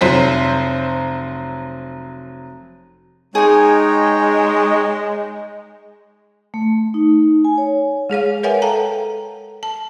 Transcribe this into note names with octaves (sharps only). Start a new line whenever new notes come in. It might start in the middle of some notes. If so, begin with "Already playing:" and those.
F1 F#3 C5 B6
G#3 D#4 G#4 C#5 G5 G#5
A3
D#4
G#5
C#5
G#3 G#4 C#5 F5
A#4 B4 C#5 E5 F#5 G#5
A4 F5 G5 A5 A#5
A5